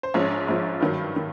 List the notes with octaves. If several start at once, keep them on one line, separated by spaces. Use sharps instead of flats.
C5
A#1 G#2 F3 C#4 C#5
A#1 G#2 F3
G2 D#3 F#3
D#3